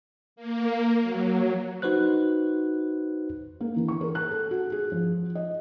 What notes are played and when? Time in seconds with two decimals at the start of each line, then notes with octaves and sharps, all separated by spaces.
0.36 A#3
1.02 F#3
1.82 D#4 F#4 B4 C5 F#6
3.61 A#3
3.76 E3
3.88 C#6
4.01 A#4
4.15 F#6
4.31 A4
4.51 F#4
4.72 G#4
4.92 F3
5.35 D#5